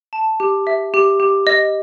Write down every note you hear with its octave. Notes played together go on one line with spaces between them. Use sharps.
A5
G4
E5
G4
G4
D#5